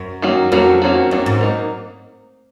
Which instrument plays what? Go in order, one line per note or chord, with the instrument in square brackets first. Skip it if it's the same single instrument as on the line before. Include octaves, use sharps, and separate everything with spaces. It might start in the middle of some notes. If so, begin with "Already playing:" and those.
Already playing: [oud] F#2
[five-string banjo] D#3 F#3 A#3 C#4 F#4
[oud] F2 [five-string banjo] D#3 F#3 A#3 C#4 F#4
[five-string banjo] D#3 F#3 A#3 C#4 F#4
[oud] F#2 [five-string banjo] D#3 F#3 A#3 C#4 F#4
[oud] G#2
[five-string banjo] F#3 A#3 D#4 A#4